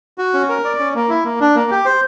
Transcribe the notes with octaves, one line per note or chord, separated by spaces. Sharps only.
F#4
C#4
A#4
D5
C#4
A#3
E4
A#3
D4
A#3
G4
C5